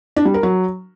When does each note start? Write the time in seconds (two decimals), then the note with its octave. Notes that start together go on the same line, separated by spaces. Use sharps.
0.16 D4
0.25 G3
0.34 A#4
0.43 F#3